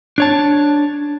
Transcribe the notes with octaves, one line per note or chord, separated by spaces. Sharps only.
D4 C#5 A5